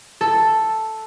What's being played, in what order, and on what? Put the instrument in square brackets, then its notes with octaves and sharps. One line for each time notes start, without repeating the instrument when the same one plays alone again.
[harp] A4